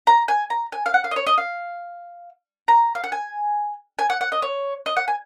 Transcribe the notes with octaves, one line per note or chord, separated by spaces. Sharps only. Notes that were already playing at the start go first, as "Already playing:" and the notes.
A#5
G#5
A#5
G#5
F5
F#5
F5
D#5
C#5
D#5
F5
A#5
F5
F#5
G#5
G#5
F#5
F#5
D#5
C#5
D#5
F#5
G#5